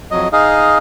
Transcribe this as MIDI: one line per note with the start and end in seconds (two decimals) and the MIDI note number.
0.11 0.28 41
0.11 0.28 54
0.11 0.28 75
0.33 0.78 63
0.33 0.78 68
0.33 0.78 75
0.33 0.78 77